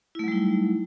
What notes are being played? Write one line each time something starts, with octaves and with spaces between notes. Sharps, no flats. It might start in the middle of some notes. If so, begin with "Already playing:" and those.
F#3 G3 A3 D#4 E4